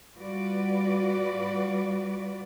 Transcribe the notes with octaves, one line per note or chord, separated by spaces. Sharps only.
G3 F4 F#4 B4 D5